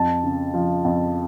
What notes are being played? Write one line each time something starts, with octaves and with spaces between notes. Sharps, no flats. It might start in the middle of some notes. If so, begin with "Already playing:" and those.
Already playing: F2 A5
C#3
F3
F2